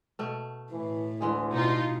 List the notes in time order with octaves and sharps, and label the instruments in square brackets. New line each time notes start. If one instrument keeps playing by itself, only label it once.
[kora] B2 A3
[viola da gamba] A2 [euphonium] E3
[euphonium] D2 [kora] E3 G#3 G#4
[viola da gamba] B2 [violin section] D#4 F4